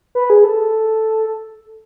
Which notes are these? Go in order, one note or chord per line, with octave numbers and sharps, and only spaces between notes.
B4
G#4
A4